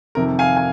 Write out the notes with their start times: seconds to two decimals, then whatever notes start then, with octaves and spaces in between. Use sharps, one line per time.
0.15 F2 C3 D#3 A#4
0.39 F5 G#5
0.57 G#5